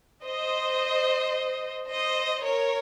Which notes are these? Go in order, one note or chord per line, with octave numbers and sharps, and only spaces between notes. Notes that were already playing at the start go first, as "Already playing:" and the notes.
C5 D#5
C5 D#5
A#4 C#5